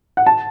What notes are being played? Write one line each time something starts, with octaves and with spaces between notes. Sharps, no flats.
F#5
A5